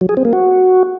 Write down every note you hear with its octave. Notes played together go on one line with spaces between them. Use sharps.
F#3
G#4
C4
A#3
F#4